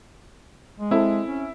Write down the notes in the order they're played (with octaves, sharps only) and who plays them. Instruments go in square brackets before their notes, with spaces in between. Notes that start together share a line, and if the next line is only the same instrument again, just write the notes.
[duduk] G#3
[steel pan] C4 A4 [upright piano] E4
[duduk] C#4